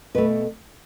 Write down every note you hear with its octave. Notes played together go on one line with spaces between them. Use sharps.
B2 A3 B4